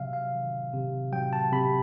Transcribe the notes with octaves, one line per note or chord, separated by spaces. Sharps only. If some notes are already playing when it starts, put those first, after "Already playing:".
Already playing: C3 F#3 E5 F5
F5
D#3
C3
F#3 G5
A5
C3 B5